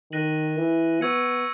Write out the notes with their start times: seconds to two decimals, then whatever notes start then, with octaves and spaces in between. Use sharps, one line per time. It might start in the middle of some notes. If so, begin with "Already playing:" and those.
0.12 D#3 F#6 A#6 D#7 F#7
0.57 E3
1.01 B3 C#6 E6 G#6 C#7